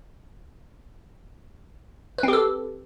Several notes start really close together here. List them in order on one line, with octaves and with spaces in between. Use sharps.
B4 C4 G4 A4